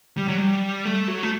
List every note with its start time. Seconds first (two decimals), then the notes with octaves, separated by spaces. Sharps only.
0.17 G3
0.28 F#3
0.37 G3
0.85 A3
1.08 F#3
1.23 A3